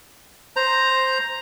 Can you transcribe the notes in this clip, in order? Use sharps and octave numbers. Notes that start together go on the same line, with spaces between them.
C5 A#5